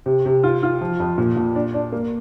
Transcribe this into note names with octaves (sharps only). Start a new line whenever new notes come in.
C3
C3
F4
F4
F3
F2
A#2
A#2
D4
D4
A#3